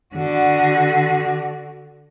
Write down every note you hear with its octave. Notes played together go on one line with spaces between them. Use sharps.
D3 F#4